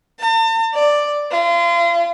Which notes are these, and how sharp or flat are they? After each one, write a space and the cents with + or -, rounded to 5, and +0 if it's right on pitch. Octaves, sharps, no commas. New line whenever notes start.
A5 +45
D5 +5
F4 -35